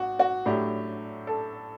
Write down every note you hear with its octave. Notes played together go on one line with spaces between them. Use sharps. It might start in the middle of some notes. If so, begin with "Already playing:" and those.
Already playing: G#1 F#4
F#4
A2 F#3 A3 D4 G4
A4